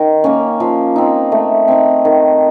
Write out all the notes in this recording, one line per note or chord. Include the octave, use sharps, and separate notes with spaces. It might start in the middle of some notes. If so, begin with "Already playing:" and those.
Already playing: D#3
A#3 C#4
F3
C4 D#4
A3
C4 D#4
D#3